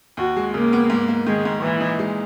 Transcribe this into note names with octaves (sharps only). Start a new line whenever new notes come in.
D#2 F#4
G#3
C#3 A#3
B3
G#2
A#3
D#3 G#3
G#2
A#2 E3
D#4
G#3